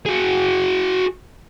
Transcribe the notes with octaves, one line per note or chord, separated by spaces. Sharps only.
F#4 G#4